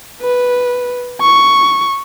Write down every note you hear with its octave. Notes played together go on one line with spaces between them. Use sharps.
B4
C#6